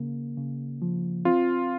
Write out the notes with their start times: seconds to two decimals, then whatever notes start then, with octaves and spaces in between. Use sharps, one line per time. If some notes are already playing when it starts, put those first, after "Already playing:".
Already playing: C#3 A#3
0.38 C#3
0.82 F3
1.25 C4 F4